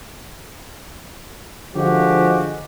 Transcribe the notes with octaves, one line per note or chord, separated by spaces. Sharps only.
D3 F3 G#3 F#4 G4